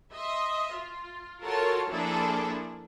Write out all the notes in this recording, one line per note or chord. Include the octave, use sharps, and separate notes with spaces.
D#5 E5 C6
F4
F4 F#4 A4 A#4 C#5 A5
F3 A#3 D4 E4 G#4 A4